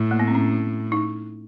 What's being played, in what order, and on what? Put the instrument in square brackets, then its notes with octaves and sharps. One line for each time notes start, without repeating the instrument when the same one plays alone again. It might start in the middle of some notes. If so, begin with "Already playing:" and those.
Already playing: [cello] A2
[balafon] A#3
B3
C4
C#4
D#4